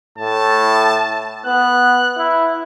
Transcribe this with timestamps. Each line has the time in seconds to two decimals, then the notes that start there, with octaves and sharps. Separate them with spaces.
0.18 A2 A5
1.46 B3 F#6
2.18 E4